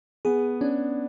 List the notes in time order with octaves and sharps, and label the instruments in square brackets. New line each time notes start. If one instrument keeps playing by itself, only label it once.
[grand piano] B3 [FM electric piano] G#4
[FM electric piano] C#4 [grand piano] D4